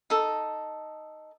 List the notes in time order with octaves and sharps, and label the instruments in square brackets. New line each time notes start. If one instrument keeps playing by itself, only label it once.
[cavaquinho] D#4 A4